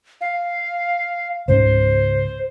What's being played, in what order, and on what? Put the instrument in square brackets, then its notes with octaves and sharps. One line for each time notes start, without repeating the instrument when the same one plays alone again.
[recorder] F5
[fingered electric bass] C#2 G#2 C#3 [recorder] C5